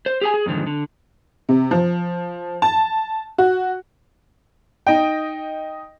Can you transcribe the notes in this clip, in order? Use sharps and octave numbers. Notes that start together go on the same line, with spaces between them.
C5
G4 G#4 G#5
G#4
F2 G#2 D3 D#3
D3
C3
F3
A5
F#4
D#4 D#5 G5